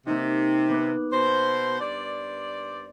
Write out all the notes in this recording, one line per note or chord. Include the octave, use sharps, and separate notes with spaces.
C3 A#3 D#4
B3 D6 F#6
B2 C5 A#6
G2 C5 D5